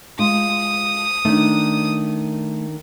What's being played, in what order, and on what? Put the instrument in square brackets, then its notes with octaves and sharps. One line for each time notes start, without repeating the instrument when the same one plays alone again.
[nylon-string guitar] G#3 F4 [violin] D#6
[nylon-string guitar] D#3 D4 [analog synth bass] A3